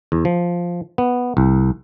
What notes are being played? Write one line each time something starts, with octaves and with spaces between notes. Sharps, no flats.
E2
F3
B3
C2